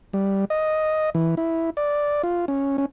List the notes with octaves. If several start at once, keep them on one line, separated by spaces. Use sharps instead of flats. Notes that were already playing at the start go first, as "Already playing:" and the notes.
G3
D#5
E3
E4
D5
F4
C#4
C#4